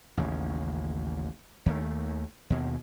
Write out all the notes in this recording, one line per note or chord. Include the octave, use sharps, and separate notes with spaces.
A1 D#2 C#3
D#2 D#3 G3 A3
D#2 B2